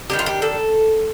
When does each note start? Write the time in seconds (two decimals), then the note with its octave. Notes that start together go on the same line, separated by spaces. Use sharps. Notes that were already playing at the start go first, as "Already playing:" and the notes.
0.10 D#3 G3 D4 G4
0.19 F4
0.26 G4
0.42 A4